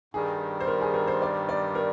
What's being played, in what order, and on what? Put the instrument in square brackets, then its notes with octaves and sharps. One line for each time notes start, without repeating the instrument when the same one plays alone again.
[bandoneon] G2 D#3 G3 [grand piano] G#4
[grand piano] C5
A#4
G#4
A#4
C5
D5
D5
A#4